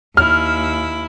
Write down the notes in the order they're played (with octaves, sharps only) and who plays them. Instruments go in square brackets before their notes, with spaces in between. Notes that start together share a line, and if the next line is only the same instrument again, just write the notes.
[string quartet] D#2 E4 [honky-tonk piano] F6